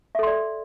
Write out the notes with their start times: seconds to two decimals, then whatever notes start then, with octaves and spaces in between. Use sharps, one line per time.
0.15 E5
0.19 A4
0.23 C6
0.27 D5